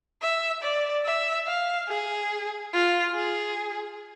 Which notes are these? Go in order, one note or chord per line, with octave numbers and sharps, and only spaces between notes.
E5
D5
E5
F5
G#4
F4
G#4